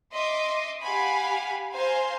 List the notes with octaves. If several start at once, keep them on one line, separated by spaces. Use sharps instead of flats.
D#5 E5 C6 D6
G4 F5 F#5 G#5 B5
C5 F5 G#5 A#5 C6